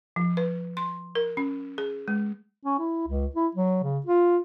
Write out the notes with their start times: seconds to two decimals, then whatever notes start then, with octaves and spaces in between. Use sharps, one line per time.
0.16 F3
0.37 B4
0.77 C6
1.15 A#4
1.37 C#4
1.78 G#4
2.08 G#3
2.65 C#4
2.79 E4
3.08 C#2
3.35 E4
3.55 F#3
3.83 C#3
4.06 F4